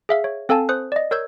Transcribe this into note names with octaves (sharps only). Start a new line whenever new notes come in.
G#4 E5 F5
C#5
C4 A4 F5 G#5 A5
C5 D#6 F#6
D5 D#5
A#4 C#5 E6 G6 G#6